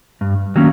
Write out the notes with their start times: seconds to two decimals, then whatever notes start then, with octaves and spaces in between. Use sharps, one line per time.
0.21 G2
0.55 D#3 F#3 A#3 C#4